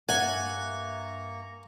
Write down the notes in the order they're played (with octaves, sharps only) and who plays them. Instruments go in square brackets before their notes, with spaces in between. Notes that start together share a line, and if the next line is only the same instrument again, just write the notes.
[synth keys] G2 E5 A6 [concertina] A#3 A#5 C#6 [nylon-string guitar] F#5 [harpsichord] G#5